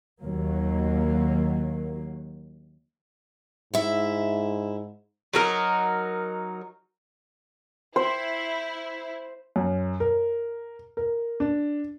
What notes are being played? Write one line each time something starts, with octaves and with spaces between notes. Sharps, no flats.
D#2 F#3 A#3
G#2 E4 E5
F#3 D#4 A#4
E4 C5
F#2
A#4
A#4
D4